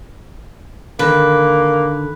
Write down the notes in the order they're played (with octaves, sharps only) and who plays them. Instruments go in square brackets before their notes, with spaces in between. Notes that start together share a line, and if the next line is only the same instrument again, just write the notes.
[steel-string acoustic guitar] D3 D#3 [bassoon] A#3 [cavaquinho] B4